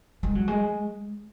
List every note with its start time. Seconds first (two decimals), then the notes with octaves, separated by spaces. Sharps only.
0.23 G#3
0.35 F#3
0.48 G#3